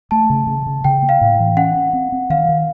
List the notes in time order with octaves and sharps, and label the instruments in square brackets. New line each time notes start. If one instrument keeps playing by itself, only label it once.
[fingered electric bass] A3 [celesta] A5
[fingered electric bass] C#3
C#3
C#3
[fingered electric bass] C#3 [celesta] G5
[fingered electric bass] A#3
[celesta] F5
[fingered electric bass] A2
E3
[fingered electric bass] C#4 [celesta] F#5
[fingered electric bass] C#4
C4
C4
[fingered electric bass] D#3 [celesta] F5
[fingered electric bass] D#3